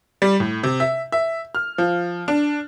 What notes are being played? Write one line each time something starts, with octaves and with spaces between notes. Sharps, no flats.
G3
A2
C3
E5
E5
F6
F3
D4